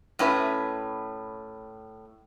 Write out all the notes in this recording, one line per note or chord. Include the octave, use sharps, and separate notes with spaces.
A2 C#4 B4 E5